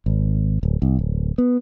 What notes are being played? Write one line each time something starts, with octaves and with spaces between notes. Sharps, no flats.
G#1
D1
C2
D1
B3